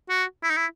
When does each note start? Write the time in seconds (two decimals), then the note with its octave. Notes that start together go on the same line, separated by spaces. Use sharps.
0.09 F#4
0.43 E4
0.50 D#4
0.57 E4